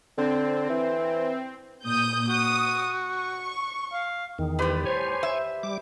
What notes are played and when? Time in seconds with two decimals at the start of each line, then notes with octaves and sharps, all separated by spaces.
0.18 D3 C4
0.70 E3
1.85 A#2 D#6 G6
2.28 F#4 D#6
3.10 C#6
3.93 F5
4.39 E2 D#3
4.59 A2 G3 G4 B4 C6
4.86 C5 C#5 G#5
5.23 E5
5.63 G3 D6